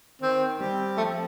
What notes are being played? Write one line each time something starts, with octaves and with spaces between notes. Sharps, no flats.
D#3 C4
G3 C4 G4
F3 A3